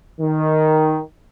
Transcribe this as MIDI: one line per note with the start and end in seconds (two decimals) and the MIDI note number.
0.20 0.99 51